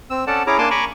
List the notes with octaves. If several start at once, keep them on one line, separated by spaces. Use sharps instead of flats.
C4 E6
C#4 A4 D5 F#5 A5
C#4 E4 G#4 C#5 A#5 D6
A#3 D4 G#5 A5 C6 D6
G#5 A#5 B5 C#6 D6